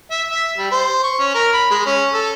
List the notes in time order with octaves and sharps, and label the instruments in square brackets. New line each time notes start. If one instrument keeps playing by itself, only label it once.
[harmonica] E5
E5
G3
C5
C#6
C#4
A#4
B5
G#3
C#4
A4